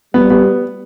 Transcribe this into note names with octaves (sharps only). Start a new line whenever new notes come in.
G3 B3
B3